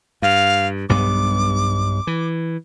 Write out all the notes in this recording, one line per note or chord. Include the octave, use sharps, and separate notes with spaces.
G2 F5
B1 G2 B3 D6
E3